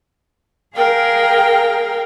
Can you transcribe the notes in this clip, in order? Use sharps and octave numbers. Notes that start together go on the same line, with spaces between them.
G#4 A#4 F5 G5